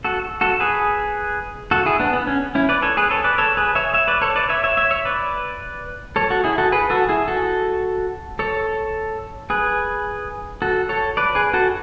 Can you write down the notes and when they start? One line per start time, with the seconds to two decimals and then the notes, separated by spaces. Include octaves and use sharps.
0.04 F#4 A4
0.41 F#4 A4
0.60 G#4 B4
1.71 F#4 A4
1.86 E4 G#4
2.00 B3 D4
2.13 B3
2.27 C#4
2.55 C#4 E4
2.69 B4 D5
2.82 A4 C#5
2.97 G#4 B4
3.11 A4 C#5
3.24 B4 D5
3.38 A4 C#5
3.57 G#4 B4
3.75 C#5 E5
3.94 C#5 E5
4.08 B4 D5
4.22 A4 C#5
4.35 B4 D5
4.49 C#5 E5
4.64 C#5 E5
4.77 C#5 E5
4.91 C#5 E5
5.05 B4 D5
6.16 A4 C#5
6.30 F#4 A4
6.44 E4 G#4
6.58 F#4 A4
6.72 G#4 B4
6.90 F#4 A4
7.09 E4 G#4
7.28 F#4 A4
8.39 A4 C#5
9.50 G#4 B4
10.62 F#4 A4
10.89 A4 C#5
11.17 B4 D5
11.35 G#4 B4
11.54 F#4 A4